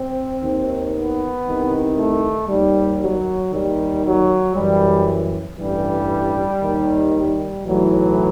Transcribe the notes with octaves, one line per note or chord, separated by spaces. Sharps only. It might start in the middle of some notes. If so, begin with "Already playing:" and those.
Already playing: C4
D#2 D#3
B3
C2 C3 D#3
A3
D#2 D#3 G3
F#3
D#2 D#3 G3
F#3
F#2 E3 G3
A1 G2 E3 G3
D#2 D#3
G3
B1 A2 E3 F#3